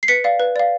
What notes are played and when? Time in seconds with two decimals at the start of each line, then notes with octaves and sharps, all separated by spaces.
0.03 C7
0.08 B4 B6 C#7
0.24 D5 F5
0.40 B4
0.56 D5 F5